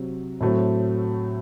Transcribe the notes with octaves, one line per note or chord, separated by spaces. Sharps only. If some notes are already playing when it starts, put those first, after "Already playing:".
Already playing: C3 F#3 C4
A2 F#3 A3 C4